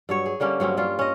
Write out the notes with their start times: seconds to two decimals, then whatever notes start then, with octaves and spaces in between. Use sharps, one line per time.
0.09 G2 F#3 C#5
0.26 G#4
0.40 D3 G3 A#3 C#4
0.60 G2 F#3 C4 C#4
0.77 G3 C#4 F4
0.99 C#4 D#5